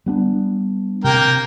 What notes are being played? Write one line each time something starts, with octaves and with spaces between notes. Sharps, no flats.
G3 B3 D4
C3 A#3 A#4 G5